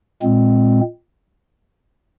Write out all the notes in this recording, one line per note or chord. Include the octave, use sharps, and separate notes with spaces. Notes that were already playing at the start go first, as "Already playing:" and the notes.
A#2 G#3 C4